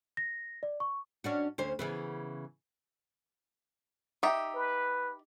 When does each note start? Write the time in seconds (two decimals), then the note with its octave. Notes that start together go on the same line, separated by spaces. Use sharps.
0.17 A#6
0.63 D5
0.80 C#6
1.24 C#4 D4 F#4
1.58 D2 C#4 C5
1.79 C#3 E3 B3
4.23 D#4 G4 E5
4.55 B4